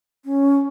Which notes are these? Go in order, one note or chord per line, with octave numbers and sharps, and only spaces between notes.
C#4